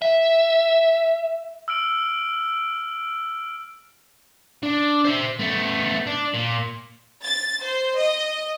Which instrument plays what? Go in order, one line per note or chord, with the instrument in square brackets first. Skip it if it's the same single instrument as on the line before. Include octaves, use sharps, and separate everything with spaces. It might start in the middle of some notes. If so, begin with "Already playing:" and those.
[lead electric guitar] E5
[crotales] E6 F6 D7 F#7
[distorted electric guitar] D4
C5 E5
A3 B3
D4
A#2
[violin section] A6
C5
D#5